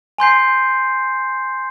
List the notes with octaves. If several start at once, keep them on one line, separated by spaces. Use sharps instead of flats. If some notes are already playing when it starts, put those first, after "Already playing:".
G#5 C6 G6 C7